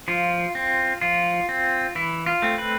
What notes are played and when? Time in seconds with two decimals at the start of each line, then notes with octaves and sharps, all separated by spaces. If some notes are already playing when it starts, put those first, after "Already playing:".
0.08 F3 F4
0.55 C4
1.01 F3 F4
1.49 C4
1.95 E3 E4
2.26 F4
2.42 A3 C4
2.58 B4